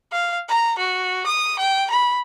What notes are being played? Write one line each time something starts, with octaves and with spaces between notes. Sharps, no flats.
F5
A#5
F#4
D#6
G5
B5